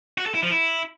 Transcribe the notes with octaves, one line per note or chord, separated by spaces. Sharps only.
F#4
A4
E4
F3
E4